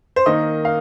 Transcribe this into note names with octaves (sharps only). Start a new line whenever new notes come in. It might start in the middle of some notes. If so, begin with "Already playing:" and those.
C5
D#3 A#3 D#4 D#5
F5